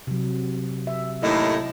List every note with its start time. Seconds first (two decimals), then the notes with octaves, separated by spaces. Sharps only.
0.07 C3 F#3
0.87 E5
1.23 D#2 A2 D#4